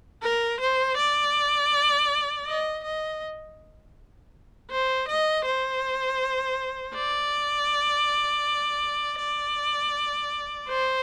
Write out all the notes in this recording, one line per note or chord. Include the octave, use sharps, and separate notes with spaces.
A#4
C5
D5
D#5
D#5
C5
D#5
C5
D5
D5
C5